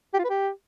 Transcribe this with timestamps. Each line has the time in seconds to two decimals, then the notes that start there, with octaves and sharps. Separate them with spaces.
0.14 G4
0.19 F4
0.24 B4
0.30 G4